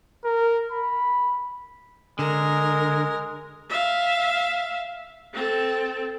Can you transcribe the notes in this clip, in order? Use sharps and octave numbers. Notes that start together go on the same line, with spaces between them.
A#4
B5
D3 G#3 A#4
E5 F5
C4 A4